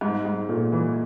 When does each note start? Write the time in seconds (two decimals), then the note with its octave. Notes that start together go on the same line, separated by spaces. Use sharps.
0.01 G#2
0.25 G#2
0.49 A#2 A3
0.72 E3